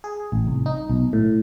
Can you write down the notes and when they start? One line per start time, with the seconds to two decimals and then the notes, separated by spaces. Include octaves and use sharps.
0.04 G#4
0.32 A1
0.47 C2
0.66 D#4
0.90 B1
1.13 A2